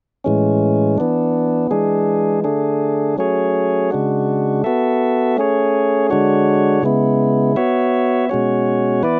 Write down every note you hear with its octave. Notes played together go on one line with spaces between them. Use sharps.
A2 E3 G#3 C#4
E3 B3 D4
E3 G#3 D4 G#4
D3 A3 D4 G#4
F#3 A3 C#4 G#4 C#5
C#3 G#3 D4 F#4
B3 F#4 A4 E5
A3 C#4 G#4 C#5
D3 G#3 D4 F#4 C#5
C#3 G#3 B3 E4
B3 F#4 C#5 E5
B2 G#3 C#4 F#4 C#5
E3 B3 E4 B4 D5